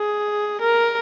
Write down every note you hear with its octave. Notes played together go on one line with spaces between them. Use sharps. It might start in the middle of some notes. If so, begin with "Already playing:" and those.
Already playing: G#4
A#4